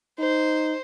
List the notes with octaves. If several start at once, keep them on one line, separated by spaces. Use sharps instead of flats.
D#4 C5